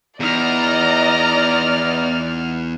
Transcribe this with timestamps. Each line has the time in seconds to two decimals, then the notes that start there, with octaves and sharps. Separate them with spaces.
0.20 E2 D#4 D5 D#5 A#5 F6